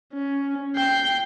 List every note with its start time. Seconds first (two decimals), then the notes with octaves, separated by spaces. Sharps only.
0.13 C#4
0.76 G5 C7